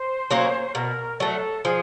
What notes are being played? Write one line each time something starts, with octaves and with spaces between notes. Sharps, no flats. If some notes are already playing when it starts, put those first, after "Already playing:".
Already playing: C5
F#3 A#3 C#4
B2 A#4
F#3 A3 A4
F3 G#4